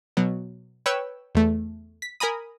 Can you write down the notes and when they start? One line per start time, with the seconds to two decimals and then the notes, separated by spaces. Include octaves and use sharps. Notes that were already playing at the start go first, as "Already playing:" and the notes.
0.17 B2 F#3
0.86 B4 C#5 G5 E6 F#6
1.35 E2 A3
2.02 B6
2.20 A#4 G#5 A#5 B5 D#6